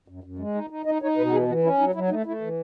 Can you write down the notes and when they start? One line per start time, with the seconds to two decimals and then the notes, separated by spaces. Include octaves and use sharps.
0.08 F#2
0.24 F#2
0.39 G#3
0.55 D#4
0.70 D#4
0.85 D#4 D#5
1.02 D#4 C#5
1.17 B2 B4
1.26 F#4
1.33 E3 G#4
1.48 E3 F#4
1.63 C#4 E4
1.79 F#3 D#4
1.95 F#3 E4
2.10 A3 D#4
2.26 A3 E4
2.41 E3